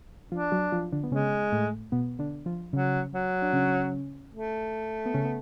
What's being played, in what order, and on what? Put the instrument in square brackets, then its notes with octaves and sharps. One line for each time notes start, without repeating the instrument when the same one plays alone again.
[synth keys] F3 F4 [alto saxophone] D4
[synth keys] F#3 F#4
F3 F4
D3 D4
B3
[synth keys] C#3 C#4 [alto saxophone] G#3
[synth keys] A2 A3
B2 B3
D3 D4
F3 F4
[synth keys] C#3 C#4 [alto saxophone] F#3
[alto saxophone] F#3
[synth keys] D4
C#3 C#4
[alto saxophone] A3
[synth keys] B3
C#3 C#4
B3